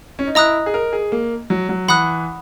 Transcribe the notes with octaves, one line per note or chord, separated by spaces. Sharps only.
C#4
D#4
E4 D#5 A#5 D#6 F#6
G#4
A#4
G#4
A#3
F#3
F#3
E3 F#5 B5 D#6 F#6